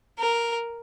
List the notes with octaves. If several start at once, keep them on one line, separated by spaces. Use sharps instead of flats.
A#4